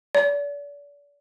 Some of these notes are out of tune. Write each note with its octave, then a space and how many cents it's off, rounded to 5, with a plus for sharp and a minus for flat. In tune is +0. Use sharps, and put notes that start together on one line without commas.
D5 -35